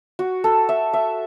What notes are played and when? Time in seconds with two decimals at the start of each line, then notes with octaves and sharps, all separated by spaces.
0.19 F#4
0.44 A4
0.69 E5
0.93 E5